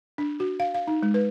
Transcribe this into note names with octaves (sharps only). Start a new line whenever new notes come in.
D4
F#4
F5
F5
D#4
G#3
B4